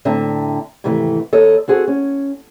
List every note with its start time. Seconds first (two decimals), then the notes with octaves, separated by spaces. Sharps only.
0.05 A2 D3 C4 E5 A5 A#5
0.84 G#2 C3 D#3 E3 A3
1.33 D#2 A4 C#5 D#5
1.68 C4 F#4 G#4 A4
1.88 C#4